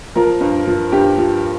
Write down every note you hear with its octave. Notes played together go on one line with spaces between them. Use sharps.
F3 A#4
G2
F3
G2 G4
F3